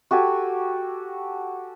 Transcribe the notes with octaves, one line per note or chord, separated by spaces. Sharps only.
F#4 G4 A4 G#5